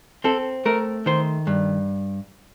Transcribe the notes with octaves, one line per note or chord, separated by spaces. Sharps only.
C4 A4
A3 A#4
D#3 C5
G2